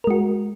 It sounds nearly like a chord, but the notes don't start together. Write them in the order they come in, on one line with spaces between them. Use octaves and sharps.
A#4 G#3 F#4